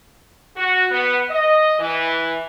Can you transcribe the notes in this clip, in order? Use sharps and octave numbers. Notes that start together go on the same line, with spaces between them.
F#4
B3
D#5
E3